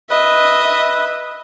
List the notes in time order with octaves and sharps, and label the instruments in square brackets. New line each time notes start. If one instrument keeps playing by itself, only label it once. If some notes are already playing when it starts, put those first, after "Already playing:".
[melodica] B4 [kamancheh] D#5 E5